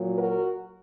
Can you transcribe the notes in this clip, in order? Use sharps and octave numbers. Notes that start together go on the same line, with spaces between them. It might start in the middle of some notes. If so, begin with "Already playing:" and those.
Already playing: A#2 F#3
F#4 A#4